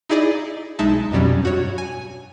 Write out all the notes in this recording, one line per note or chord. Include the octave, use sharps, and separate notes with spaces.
D#4 E4 G#4 D5 D#5
B1 G#3 D#4 E5 A5
F2 B2 F#3 G3 C#4
G2 F#4 C#5
G#5